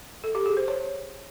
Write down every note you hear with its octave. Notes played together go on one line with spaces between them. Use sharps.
A4
G4
G#4
C5
C#5